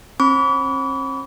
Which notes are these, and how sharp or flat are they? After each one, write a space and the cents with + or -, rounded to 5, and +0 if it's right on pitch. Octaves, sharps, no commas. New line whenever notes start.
C4 +45 B5 +0 D6 -45